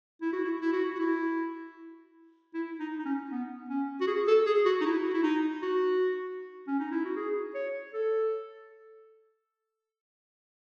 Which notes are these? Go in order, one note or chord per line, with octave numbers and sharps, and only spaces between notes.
E4
F#4
E4
E4
F#4
E4
F#4
E4
E4
D#4
D#4
C#4
B3
C#4
F#4
G#4
A4
G#4
F#4
D#4
E4
F#4
E4
D#4
F#4
C#4
D#4
E4
F#4
G#4
C#5
A4